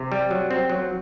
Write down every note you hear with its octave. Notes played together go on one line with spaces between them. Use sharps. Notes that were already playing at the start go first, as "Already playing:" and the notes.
Already playing: C3
G3
F#3
C4
F#3